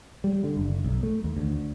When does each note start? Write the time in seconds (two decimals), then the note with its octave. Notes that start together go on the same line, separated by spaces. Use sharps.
0.24 G3
0.44 D3
0.57 F#1
0.84 B1
1.03 A3
1.24 D#2
1.37 D2